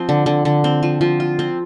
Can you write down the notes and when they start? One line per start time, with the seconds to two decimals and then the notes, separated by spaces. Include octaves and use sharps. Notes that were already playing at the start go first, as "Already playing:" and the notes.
Already playing: F3 C4
0.09 D3
0.26 D3
0.45 D3
0.64 C4
0.83 F3
1.01 F3
1.20 F4
1.39 C4